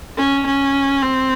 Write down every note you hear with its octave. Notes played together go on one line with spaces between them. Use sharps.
C#4
C#4
C4